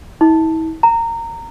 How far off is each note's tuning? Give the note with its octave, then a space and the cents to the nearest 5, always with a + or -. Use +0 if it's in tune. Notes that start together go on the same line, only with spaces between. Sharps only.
E4 -40
A#5 -20